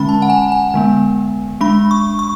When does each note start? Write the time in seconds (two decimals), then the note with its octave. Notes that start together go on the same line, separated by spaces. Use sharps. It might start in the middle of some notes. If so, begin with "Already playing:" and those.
Already playing: D3 G#3 C#4 B5
0.09 A5
0.22 F#5
0.30 G#5
0.52 G#5
0.74 D3 G#3 B3
1.61 G#3 D4 B5
1.91 C#6
2.19 C#6